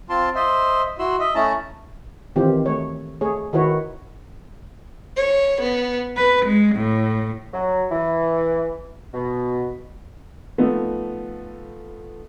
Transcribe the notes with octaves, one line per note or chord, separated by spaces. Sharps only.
C4 F4 A5 C6
C5 D#5 E5 C6
E4 F#4 C6 E6
D#5 E5
A3 C#4 E4 A5 A#5
D#3 E3 C4 F4 G4
A3 C#5
A3 G#4 C#5
D#3 E4 F#4 B4 C#5
C#5
B3
B4
G#3
A2
F#3
E3
B2
F3 A3 B3 D#4 A4